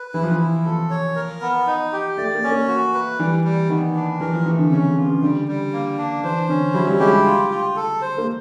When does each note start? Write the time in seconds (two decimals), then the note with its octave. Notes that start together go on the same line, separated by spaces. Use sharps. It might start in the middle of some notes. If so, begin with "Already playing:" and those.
Already playing: B4
0.14 E3 E4
0.23 F3
0.31 E3
0.39 E4
0.65 F3 A4
0.90 C#5
1.16 A#4
1.41 B3
1.67 D#4
1.92 G4
2.17 A3 D5
2.35 A#3
2.43 C#4
2.51 A#3
2.68 F#4
2.94 B4
3.19 E3 G3
3.44 G3
3.69 D#3 B3
3.95 D4
4.20 E3 A#4
4.33 F3
4.46 E3 A3
4.58 D3
4.71 C#3 C#4
4.88 C#3
4.97 F4
5.05 C#3
5.22 D3 G3
5.48 G3
5.73 A#3
5.98 D4
6.24 E3 C5
6.49 D3 C#4
6.74 F#3 E4
6.87 G3
7.00 G#3 G4
7.25 F4
7.51 F4
7.76 A4
8.02 C5
8.18 A#3